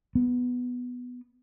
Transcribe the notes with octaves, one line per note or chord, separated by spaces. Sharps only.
B3